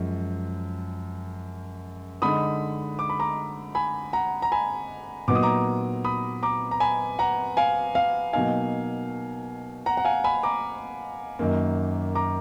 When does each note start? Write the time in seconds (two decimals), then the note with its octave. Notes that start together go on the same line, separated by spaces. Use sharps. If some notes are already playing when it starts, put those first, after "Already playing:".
Already playing: F#2 F3 G#3
2.22 D3 G#3 D#4 B5 D#6
2.99 D6
3.09 B5
3.20 A#5 D6
3.75 G#5 B5
4.13 F#5 A#5
4.42 A#5
4.52 G#5 B5
5.28 A#2 F#3 B3 D#4 D6
5.35 D#6
5.43 A#5 D6
6.04 B5 D#6
6.43 A#5 D6
6.71 A#5
6.80 G#5 B5
7.19 F#5 A#5
7.57 F5 G#5
7.95 F5
8.33 B2 F#3 A#3 D#4 F5 G#5
9.86 F#5 A#5
9.97 F#5
10.05 F5 G#5
10.24 G#5 B5
10.43 A#5 D6
11.39 F#2 D#3 A#3
12.15 A#5 D6